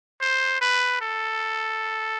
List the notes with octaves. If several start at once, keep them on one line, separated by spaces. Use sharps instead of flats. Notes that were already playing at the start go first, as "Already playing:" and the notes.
C5
B4
A4